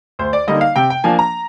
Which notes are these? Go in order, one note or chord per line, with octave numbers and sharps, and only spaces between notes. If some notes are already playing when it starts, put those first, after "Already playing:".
D2 C5
D5
D3 G3 A#3 D#4 D#5
F5
C3 G5
G5
F3 A#3 D4 G#5
A#5